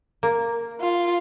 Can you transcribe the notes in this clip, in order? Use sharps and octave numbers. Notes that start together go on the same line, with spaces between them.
A#3
F4